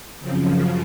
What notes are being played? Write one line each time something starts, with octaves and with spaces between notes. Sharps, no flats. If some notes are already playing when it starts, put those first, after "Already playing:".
F#2 C#3 F3 C4